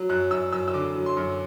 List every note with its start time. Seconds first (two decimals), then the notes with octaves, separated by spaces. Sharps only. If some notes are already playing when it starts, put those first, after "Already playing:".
Already playing: F#3
0.09 F#2 F#6
0.31 F#2 E6
0.53 F#2 E6
0.68 E6
0.74 D3 D6
0.95 F#3
1.06 C6
1.17 F#2